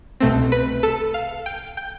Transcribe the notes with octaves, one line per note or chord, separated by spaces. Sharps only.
C2 B2 A3 C4
B4
A4
F5
G5
G5